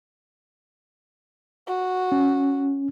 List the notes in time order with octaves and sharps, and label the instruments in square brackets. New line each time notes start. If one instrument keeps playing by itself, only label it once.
[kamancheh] F#4
[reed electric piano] C#4